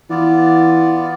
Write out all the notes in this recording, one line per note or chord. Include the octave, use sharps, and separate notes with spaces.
E3 B3 F4 D5